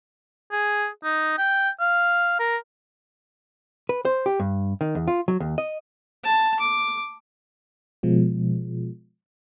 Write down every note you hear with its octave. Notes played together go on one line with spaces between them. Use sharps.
G#4
D#4
G5
F5
A#4
B4
C5
G4
G2
D#3
E2
F4
F#3
D#2
D#5
A5
D6
B2 F3 G#3